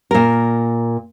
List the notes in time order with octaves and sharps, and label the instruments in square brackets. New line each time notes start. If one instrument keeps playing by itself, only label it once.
[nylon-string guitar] A#2 A#4